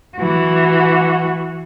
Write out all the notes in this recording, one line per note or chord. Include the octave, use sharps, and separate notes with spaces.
E3 F#4